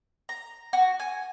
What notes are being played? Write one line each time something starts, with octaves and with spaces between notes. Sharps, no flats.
A#5
F#4
G#5